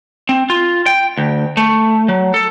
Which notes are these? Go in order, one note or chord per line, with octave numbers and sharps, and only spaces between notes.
C4
F4
G5
D2
A3
F#3
A4